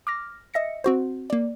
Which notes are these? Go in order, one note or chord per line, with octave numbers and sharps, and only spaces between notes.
D6 F6 A#6
D#5 E5 A#6 C#7
C4 F#4 C5
A#3 D5